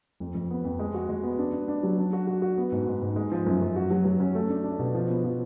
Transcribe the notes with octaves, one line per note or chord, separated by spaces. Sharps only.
F2
F2
B3
F2
G#3
F#4
G#3
B3
D4
D4
D4
F#3
D4
F#4
F#4
F#4
B3
G#2
G#2
G#2
G#3
F3
F#2
F#2
F#4
F#3
F#3
C#4
A3
D4
D4
B2
F3
B3
F3